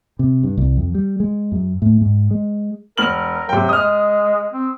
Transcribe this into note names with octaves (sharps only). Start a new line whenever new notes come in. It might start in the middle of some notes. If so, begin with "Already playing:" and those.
C3
G2
C2
F2
G3
G#3
F#2
A2
G#2
G#3
E1 A#4 F6 F#7
C3 F#3 G5
G#3 D#6 F6
C4